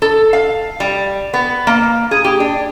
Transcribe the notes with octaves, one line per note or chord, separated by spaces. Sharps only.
A4
F5
G3
B3
A#3
G#4
G4
D4